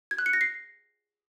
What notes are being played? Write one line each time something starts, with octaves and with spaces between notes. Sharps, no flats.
G#6
F#6
C#7
A#6
C7